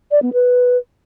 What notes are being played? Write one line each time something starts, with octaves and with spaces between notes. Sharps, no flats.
D5
B3
B4